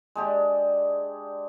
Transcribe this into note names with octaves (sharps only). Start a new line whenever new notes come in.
G#3 D4 G4